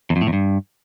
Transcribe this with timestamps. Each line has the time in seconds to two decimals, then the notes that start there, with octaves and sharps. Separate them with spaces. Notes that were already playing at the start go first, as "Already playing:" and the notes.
0.10 E2
0.16 F2
0.22 A2
0.27 E2
0.33 G2